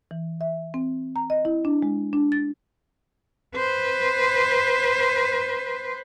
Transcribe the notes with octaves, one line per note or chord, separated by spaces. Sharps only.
E3
E5
C4
A#5
D#5
E4
D4
G#3
D4
A6
B4 C5